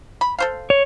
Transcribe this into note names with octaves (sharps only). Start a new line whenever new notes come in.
B5
A4 C5 F5
C#5